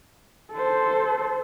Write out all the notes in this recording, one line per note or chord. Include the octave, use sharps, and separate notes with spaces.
A4 C5